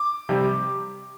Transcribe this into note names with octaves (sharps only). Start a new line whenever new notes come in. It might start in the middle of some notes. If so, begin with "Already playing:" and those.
Already playing: D6
C3 G3